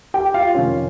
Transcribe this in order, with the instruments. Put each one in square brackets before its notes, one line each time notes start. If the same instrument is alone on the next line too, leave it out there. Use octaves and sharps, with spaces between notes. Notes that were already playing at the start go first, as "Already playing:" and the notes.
[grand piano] G4 G5
F4 F5
F2 C3 D#3 C#4 C#5